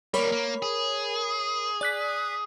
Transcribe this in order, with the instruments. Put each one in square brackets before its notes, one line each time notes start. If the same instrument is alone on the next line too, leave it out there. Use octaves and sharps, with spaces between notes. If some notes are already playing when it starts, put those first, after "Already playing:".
[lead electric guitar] G3 A#3 [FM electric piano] A#4 C#5 B5
[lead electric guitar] A#3
G#4
[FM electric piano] D5 F#6 B6